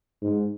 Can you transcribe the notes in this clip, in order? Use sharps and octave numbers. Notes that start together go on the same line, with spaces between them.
G#2